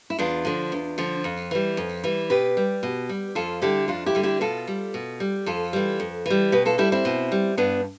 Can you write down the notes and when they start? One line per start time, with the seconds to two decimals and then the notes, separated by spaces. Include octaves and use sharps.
0.10 E4
0.18 E2 D4 F4
0.45 D3 F3
0.72 E2
0.98 D3 F3
1.24 F2
1.51 E3 G3
1.77 F2
2.04 E3 G3
2.30 B2 G4 B4
2.57 G3
2.83 B2
3.09 G3
3.35 F2 F4 A4
3.62 D3 G3 E4 G4
3.88 F2 D4 F4
4.06 E4 G4
4.15 D3 G3
4.23 E4 G4
4.41 B2 F4 A4
4.67 G3
4.94 B2
5.20 G3
5.46 F2 F4 A4
5.73 E3 G3
6.00 F2
6.26 E3 G3
6.52 B2 G4 B4
6.65 F4 A4
6.78 G3 E4 G4
6.92 C4 E4
7.05 B2
7.32 G3
7.57 G2 B3 D4